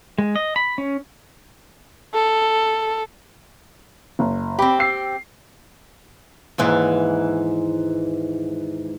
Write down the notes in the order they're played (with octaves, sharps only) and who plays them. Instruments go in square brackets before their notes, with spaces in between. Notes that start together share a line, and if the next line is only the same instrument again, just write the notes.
[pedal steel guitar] G#3
D#5
B5
C#4
[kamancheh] A4
[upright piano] F#1
[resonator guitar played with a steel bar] C4 G4 [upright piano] B5
[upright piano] E6 C7
[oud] D#2 G#2 E3